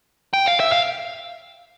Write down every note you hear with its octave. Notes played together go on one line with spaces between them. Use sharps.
G5
F5
E5
F5